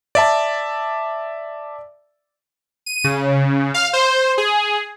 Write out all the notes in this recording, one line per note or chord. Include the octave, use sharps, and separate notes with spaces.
D5 E5 A5
D#7
C#3
F5
C5
G#4